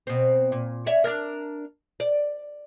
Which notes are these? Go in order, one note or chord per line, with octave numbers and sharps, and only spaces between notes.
B2 C4
A#2
C#5 D5 E5
D4 A#4
D5